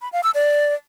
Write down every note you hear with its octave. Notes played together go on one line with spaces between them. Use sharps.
B5
F5
E6
D5